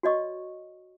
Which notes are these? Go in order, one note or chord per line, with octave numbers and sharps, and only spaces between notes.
F#4 C#5 D#5 C#6